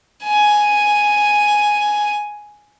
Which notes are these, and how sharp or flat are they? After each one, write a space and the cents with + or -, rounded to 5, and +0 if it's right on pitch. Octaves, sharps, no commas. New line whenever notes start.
G#5 +5